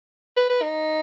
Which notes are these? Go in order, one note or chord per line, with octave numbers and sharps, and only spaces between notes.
B4
B4
D#4